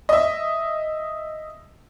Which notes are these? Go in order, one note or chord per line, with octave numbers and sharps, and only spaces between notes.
D#5 E5